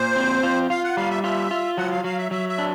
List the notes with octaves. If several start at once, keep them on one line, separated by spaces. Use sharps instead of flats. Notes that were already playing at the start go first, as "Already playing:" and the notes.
Already playing: A#2 C5
C4
F4
F4 F5
F#5
G3 F5
E5
F4 E5
F4
F#3 F#5
F5
F#3 F5
E5
F#3 E5
E5
D4